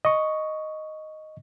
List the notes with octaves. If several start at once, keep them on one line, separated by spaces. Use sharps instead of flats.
D#5 C#6